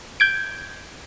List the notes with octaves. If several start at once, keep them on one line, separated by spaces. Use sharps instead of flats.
G6 G#6 D7